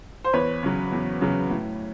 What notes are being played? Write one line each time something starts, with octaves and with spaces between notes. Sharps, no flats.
C5
E2 B4 C#5
C#3 F#3
E2
C#3 F#3
A2